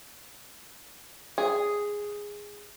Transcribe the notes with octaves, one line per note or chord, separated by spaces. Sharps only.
G#4